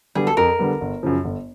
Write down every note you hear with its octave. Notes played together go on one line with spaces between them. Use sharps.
D3 G3 B3 G#4
A4
F2 A#4
D3 G3 B3
G1
F#2 C#3 F3
G1